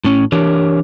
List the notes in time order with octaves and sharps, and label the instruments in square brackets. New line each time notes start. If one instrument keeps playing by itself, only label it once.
[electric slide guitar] A2 C#4
E3 D4 G4 A#4 C#5